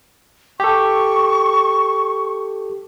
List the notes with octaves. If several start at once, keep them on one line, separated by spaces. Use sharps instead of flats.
G4 A4 C#6